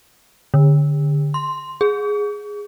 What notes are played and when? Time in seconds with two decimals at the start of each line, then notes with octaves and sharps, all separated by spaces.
0.54 D3
1.34 C6
1.81 G#4